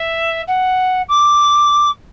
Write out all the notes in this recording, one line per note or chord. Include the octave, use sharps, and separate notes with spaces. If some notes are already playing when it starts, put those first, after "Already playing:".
Already playing: E5
F#5
D6